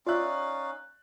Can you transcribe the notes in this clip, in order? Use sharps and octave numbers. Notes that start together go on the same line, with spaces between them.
C#4 D#4 F4 D5 E5 F5 F#6